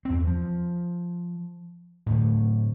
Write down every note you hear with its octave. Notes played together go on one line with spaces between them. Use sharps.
E2 C4
F3
D1 D2 A2